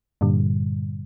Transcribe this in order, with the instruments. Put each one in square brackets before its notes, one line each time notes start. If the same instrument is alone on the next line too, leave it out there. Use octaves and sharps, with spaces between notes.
[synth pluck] G2 A#2 D3 G3